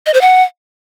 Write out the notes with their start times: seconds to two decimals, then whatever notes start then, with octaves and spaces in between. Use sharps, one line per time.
0.06 D#5
0.14 C5
0.21 F#5